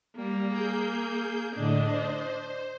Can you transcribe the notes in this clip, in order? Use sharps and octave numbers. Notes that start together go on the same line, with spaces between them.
G3 A#3
G#4 G6
A2 D3 D4 D#5
C5